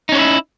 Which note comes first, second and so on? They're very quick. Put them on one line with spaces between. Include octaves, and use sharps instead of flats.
D#4 C#4 C#5 E4